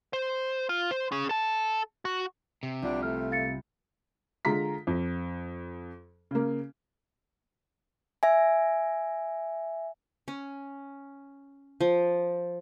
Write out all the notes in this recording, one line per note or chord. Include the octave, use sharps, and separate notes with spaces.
C5
F4
C5
C#4 G#4
A4 A5
F#4
C3
C2 D4 F4
A3 F6
F5 A6 C#7
D3 G#3 F4 A#5 B6
F2
C#3 A#3
E5 G#5
C#4
F3